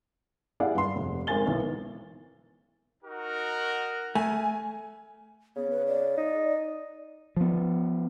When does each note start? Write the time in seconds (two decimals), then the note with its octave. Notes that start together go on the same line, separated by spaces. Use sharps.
0.60 E4 G4 G#4 D5 F5 F#5
0.75 G2 C6
0.96 F1
1.27 G#1 D#3 A#4 G#5 A6 G7
1.46 B1 E3
3.03 D#4 F#4 A#4
4.15 A3 G#5
5.56 C#3 B3
5.70 B4
5.86 D5
6.17 D#4
7.37 F3 B3